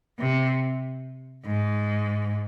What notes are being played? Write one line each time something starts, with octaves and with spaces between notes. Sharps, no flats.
C3
G#2